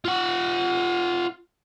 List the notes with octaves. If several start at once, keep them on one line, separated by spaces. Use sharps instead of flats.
F4 F#5